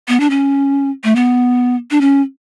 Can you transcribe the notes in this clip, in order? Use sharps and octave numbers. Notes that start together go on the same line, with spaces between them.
B3
D4
C#4
A3
B3
D4
C#4